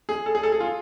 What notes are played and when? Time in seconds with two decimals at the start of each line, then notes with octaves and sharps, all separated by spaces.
0.09 G#4
0.26 A4
0.35 G#4
0.43 A4
0.52 G#4
0.60 F4